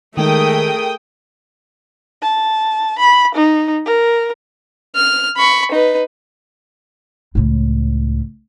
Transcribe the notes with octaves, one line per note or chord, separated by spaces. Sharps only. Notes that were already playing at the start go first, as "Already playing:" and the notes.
D#3 G#3 A3 D#4 G#4 A#4 G5 D#6
A5
B5
D#4
A#4
F6
B5 C#6
D#4 B4
C#2 A2